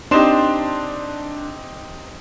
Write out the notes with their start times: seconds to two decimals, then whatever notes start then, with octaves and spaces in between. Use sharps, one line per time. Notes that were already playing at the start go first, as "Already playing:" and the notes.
0.11 C4 D4 D#4 G4 C6 E7